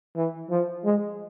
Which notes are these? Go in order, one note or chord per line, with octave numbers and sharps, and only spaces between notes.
E3
F3
G#3